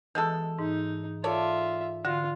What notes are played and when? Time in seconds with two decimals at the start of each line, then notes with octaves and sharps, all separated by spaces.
0.15 B2 E3 G#3 A4
0.59 G#2 D#4
1.24 F4 A4 C#5 D5 E5
2.05 D3 F4 F#4